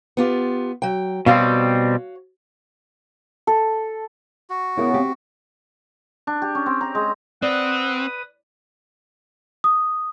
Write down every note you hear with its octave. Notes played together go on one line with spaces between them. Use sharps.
B3 F4 G4
F#3 G5
B2 G3 C4 F#4 C#5 F5
A4
F#4
C#3 B3 E4 A#4
C4 G4
D4
G4
C#4
C4
A#5
G#3
C4 B4 D5 F#5 D#6
D#6